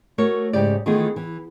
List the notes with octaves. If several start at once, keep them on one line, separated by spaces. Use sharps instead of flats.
A3 F#4 A#4 C#5
G#2 C#3 G4 D5
D#3 E3 A3 B3 F4 G#4
E3